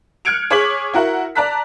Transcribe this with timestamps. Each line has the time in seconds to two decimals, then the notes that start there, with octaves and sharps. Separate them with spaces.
0.25 F6 F#6 G#6 C#7 D7 F7
0.50 G#4 C#5 D6 G#6 B6 F#7
0.93 E4 F#4 A#4 F#5
1.35 D5 A5 A#5 F#6 B6